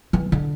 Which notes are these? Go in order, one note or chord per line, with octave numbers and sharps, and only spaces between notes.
E3
D3